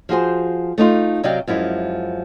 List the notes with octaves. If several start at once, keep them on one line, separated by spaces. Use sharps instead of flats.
F3 F#4 G#4 C5
A3 D#4 F4
C3 F#3 D5 D#5 F5 G5
F#2 F3 G#3 E4